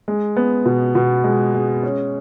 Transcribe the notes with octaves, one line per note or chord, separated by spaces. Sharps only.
G#3
B3
B2
B2
G#3
G#3
C#4